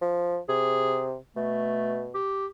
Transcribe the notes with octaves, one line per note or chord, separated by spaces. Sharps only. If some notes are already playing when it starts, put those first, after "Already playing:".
F3
C3 G#4
B2 A3
G4